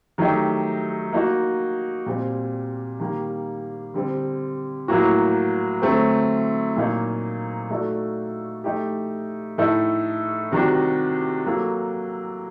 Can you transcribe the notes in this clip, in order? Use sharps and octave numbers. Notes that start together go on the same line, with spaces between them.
D#3 F#3 A3 D#4 G4
A#3 D#4 F#4
A#2 G3 C4
D#3 G3 A#3
D3 G3 C4
A2 F#3 A#3 F#4
D3 F#3 A3 C4
A#2 F#3 A#3 D#4
A3 D#4 F#4 A4 D5
A3 D#4 G4
A2 A3 D#4 A4
C3 D#3 G3 D4 F#4
F#3 A#3 F#4 A4